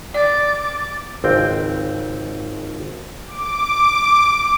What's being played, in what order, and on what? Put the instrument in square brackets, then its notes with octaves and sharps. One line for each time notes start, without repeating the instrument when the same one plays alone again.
[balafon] D5 [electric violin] D6 A6
[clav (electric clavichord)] G#1 C#2 C4 G5
[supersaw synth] D6